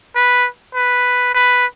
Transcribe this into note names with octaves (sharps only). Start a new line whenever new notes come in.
B4
B4
B4